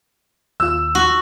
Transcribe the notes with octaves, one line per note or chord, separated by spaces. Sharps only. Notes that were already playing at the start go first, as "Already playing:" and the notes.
D#2 F4 E6
F#4